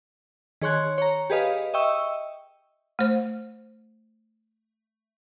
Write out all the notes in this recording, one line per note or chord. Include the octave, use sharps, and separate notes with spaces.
D#3 G#4 C#5 C6 F#6 G#6
C#5 A#5
G4 G#4 B4 D#5 F5
D#5 E5 G5 C#6 E6
A3 C5